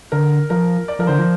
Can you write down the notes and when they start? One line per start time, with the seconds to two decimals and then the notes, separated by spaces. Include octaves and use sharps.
0.12 D3 A#4
0.50 F3 A#4
0.88 D5
0.99 F3 A#4
1.07 D3 C5
1.19 F3